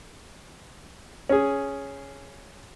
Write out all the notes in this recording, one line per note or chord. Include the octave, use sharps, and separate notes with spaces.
C#4 G#4